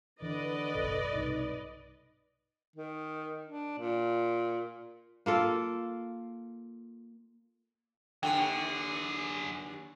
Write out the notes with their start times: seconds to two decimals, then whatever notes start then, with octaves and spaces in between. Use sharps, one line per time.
0.22 D3 E3 B4 D5 D#5
0.75 F#1 B1 A4
1.14 B1 G2 C3 D#4
2.76 D#3
3.47 D4
3.78 A#2
5.26 A#3 F4 A4
8.23 D#2 D3 F#3 G#4 G5